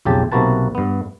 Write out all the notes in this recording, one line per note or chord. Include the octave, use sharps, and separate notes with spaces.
B1 F2 C#3 G4 A5
B1 C3 A#3 F#4 B4 A5
G2 B3